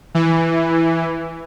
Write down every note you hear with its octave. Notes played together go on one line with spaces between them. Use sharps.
E3